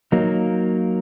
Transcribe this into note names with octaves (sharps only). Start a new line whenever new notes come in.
F#3 A#3 D#4